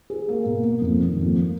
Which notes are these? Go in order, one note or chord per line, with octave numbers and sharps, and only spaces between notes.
G#4
A#3
B2
A#3
F2
D#3
F2
A#3